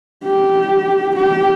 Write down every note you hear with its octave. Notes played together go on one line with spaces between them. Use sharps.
G4
G4